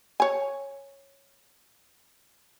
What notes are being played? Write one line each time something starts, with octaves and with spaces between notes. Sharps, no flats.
C#5 G#5